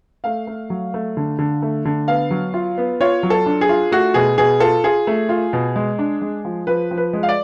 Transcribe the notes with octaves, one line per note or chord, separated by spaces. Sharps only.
A3 F5
A3
F#3
A3
D3
D3
A3
D3
B3 F5
F#3
F4
B3
F4 C#5
F#3
A4
D4
G#4
F4
A3 F#4
B2 G#4
B2 G#4
F4 A4
F4 G#4
A3
F4
B2
G#3
D4
G#3
F3
F3 B4
F3
B4
G#3
F5
D5